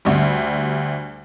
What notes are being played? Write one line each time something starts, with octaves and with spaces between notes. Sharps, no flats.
D2 G3